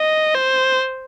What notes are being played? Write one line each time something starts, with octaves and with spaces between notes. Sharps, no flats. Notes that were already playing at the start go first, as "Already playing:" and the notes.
Already playing: D#5
C5